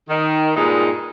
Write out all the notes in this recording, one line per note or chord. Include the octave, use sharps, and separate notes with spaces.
D#3
G2 A#2 G#3 D#4